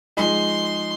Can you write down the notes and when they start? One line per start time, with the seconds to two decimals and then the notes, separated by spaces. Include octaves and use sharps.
0.17 F3 G#3 D#4 G#4 C6